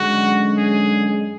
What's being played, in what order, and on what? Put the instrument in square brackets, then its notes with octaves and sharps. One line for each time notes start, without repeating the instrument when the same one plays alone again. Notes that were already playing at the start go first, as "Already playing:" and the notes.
Already playing: [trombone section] F#2 D3 G#3 C#4 [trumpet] F#4
[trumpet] G#4